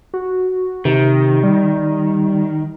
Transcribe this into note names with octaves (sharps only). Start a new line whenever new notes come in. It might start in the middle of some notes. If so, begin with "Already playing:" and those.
F#4
C3 D#3
G3